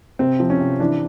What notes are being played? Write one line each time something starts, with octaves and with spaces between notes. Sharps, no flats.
C3 C4
F3
C#4
C3
E3 D4